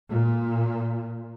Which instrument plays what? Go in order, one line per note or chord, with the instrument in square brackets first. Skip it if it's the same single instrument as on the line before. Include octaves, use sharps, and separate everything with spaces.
[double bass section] A#2